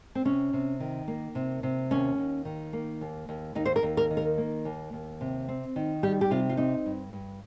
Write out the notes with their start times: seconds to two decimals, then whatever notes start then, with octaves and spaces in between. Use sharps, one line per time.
0.15 C4
0.25 C3 C#4
0.53 C3
0.80 D#3
1.08 A#3
1.35 C3
1.63 C3
1.91 D#2 C#4
2.18 D#2
2.45 D#3
2.73 A#3
3.01 D#2
3.29 D#2
3.55 D#2 D#4
3.65 C5
3.76 A#4
3.83 D#2
3.97 A#4
4.10 D#3
4.17 A#4
4.38 A#3
4.65 D#2
4.93 D#2
5.21 C3
5.49 C4
5.76 D#3
6.03 G3 G4
6.21 G4
6.31 C3 F4
6.49 F4
6.57 C4 D#4
6.86 G2
7.13 G2